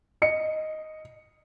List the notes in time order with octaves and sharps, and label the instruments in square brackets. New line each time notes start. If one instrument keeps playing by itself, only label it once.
[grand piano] D#5 C#7